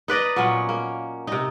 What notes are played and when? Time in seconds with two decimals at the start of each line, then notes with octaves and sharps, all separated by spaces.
0.08 D#4 B4 D5 D#5
0.36 A#2 F#3 B3 C#4
0.69 A#3
1.27 C3 D#4